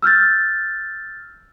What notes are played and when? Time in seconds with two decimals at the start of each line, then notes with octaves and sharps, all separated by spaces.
0.02 E6 F6 G6 A6